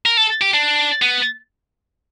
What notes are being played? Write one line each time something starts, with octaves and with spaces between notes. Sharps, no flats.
A#4
A4
G4
D4
B3